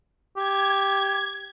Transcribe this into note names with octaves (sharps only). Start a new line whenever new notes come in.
G4 G#6